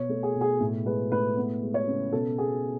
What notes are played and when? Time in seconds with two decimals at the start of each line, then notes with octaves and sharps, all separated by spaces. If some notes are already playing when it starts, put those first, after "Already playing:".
Already playing: B2 C#5
0.09 A3
0.23 G#4
0.35 B2
0.41 G#4
0.61 A2
0.85 G#3 B4
1.12 A2 B4
1.36 B3
1.62 G#3
1.74 C#5
1.87 C#3
2.12 B2 A4
2.38 B3 G#4